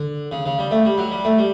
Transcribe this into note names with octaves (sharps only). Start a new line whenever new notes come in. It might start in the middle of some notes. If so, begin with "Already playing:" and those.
Already playing: D3
C#3
C#3
G3
A3
G3
F#3
G3
A3
G3